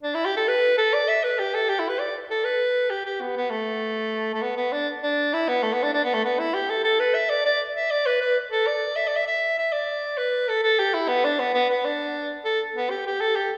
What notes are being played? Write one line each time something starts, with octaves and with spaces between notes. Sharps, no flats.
D4
E4
G4
A4
B4
A4
D5
E5
B4
G4
A4
G4
E4
B4
D5
A4
B4
G4
G4
B3
B3
A3
A3
B3
B3
D4
D4
E4
B3
A3
B3
D4
D4
B3
A3
B3
E4
G4
A4
A4
B4
E5
D5
D5
E5
D5
B4
B4
A4
D5
E5
D5
E5
E5
E5
D5
B4
A4
A4
G4
E4
B3
D4
B3
B3
B3
D4
A4
B3
G4
G4
A4
G4